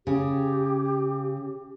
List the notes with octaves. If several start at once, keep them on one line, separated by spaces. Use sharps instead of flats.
C#3 G4